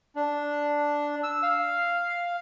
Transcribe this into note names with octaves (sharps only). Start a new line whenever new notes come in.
D4
E6
F5